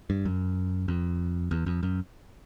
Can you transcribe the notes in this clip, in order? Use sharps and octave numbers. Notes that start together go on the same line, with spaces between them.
G2
F#2
F2
E2
F2
F#2